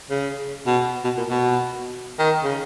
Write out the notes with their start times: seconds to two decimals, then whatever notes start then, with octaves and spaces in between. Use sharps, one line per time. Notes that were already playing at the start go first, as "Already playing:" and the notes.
0.10 C#3
0.67 B2
1.04 B2
1.17 A#2
1.30 B2
2.19 D#3
2.44 C#3